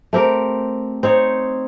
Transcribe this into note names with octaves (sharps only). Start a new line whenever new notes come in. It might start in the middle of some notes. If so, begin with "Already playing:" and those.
A3 C4 G4 A#4
C4 D#4 C#5